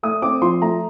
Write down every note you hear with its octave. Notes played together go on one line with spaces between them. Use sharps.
A3 D#6
C4 D6
F3 C6
A3 A#5